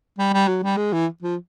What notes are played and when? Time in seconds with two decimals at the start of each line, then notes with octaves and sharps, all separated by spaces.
0.18 G3
0.33 G3
0.48 F#3
0.63 G3
0.77 G#3
0.93 E3
1.22 F3